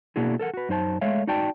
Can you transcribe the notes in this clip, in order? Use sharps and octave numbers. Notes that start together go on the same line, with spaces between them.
B2 A#3 D4 E4 F#4 G#4
A4 A#4 F#5
F#4 B4
F#2 D#4 C5 A5
G#3 A3 C#5 E5 F5
D#4 F#4 D5 G5 A5